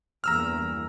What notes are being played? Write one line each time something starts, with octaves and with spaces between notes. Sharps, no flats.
E2 G2 A#3 A#5 E6 F6